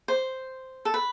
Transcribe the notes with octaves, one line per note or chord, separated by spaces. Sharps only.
C5
A4
B4